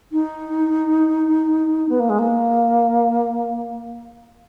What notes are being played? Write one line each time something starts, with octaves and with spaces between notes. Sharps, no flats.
D#4
B3
A#3
G#3
A#3